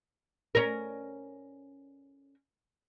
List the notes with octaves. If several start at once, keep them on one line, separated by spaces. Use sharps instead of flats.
C#4 A#4